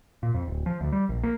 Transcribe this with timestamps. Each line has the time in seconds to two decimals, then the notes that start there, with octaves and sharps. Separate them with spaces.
0.23 A#2
0.35 F2
0.48 D1
0.66 F3
0.81 D2
0.92 G3
1.09 A#1
1.23 A#3